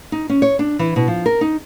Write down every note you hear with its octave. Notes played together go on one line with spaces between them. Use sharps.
D#4
C#4
C#5
D4
E3
B2
F3
A#4
D#4